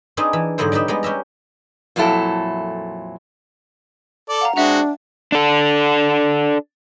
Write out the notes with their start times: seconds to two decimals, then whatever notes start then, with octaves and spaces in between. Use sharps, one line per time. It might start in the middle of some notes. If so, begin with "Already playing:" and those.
0.17 C4 D4 D#4 G#4 B4
0.33 E3
0.58 G#2 D3 F#3 B3 E4 C5
0.72 G3 D#4 G4 B4 E5
0.88 G3 G#3 B3
1.03 C#4 G4 E5 A#5
1.96 F2 A#2 F#3 E4 A4
4.29 A4 D5
4.41 F5 F#5 A#5
4.56 G#3 C4 D4 F#4 E5 F#5 F7
5.32 D4 A4